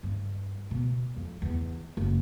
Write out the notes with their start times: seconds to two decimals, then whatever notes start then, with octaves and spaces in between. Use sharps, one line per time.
0.03 G2
0.71 B2
1.16 F2
1.42 E2
1.97 F#1